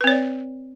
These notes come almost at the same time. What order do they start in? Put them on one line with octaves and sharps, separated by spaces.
B4 C4 C#5 D5